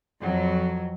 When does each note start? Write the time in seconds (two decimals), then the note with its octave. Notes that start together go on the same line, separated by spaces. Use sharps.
0.21 F2 F#3